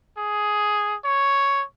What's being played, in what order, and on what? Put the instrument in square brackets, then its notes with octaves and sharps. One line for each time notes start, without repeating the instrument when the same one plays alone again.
[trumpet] G#4
C#5